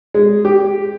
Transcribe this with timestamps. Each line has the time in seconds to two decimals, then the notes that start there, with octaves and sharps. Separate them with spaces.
0.14 G#3
0.45 G4